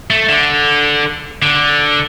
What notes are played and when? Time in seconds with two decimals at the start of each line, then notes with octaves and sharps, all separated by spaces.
0.10 A3
0.29 D3
1.42 D3